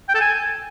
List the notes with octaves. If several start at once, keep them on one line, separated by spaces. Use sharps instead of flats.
G5
A4
G#5